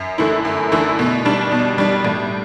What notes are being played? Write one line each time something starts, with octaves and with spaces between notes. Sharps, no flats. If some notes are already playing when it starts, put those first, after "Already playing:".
Already playing: F#2
D3 A3 E4
F#2
D3 A3 E4
B2
G3 D4
B2
G3 D4
A2